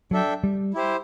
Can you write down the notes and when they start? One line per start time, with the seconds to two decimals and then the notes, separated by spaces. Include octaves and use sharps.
0.11 F#3 D4 A4 E5 G5
0.44 G3
0.74 E4 G4 C5